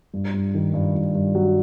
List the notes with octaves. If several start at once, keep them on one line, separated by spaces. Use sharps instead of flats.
G2
G2
D#3
G2
G2
G2
F#3